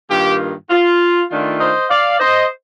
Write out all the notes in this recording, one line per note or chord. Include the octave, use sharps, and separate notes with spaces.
G2 D#3 A#3 F4 G4
F4
D#3 A3 D4 F4
C5 D#5
D5 F5
C5 D#5